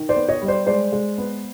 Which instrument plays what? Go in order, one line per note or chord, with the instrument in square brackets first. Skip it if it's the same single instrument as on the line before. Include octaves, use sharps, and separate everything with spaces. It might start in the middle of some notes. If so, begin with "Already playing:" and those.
Already playing: [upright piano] D#3
C5 D5
B3
C#5 D#5
G3
C5 D5
G#3 C5 D5
G#3
B3